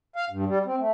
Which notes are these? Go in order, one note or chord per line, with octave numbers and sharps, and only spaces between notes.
F5
G2
G3
C4
A3